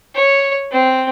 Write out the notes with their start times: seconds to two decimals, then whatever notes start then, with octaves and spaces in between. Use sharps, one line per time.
0.15 C#5
0.71 C4